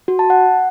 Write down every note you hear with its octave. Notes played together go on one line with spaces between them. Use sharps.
F#4
A5
F#5